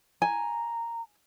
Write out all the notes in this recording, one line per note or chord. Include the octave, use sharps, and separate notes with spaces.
G#5 A#5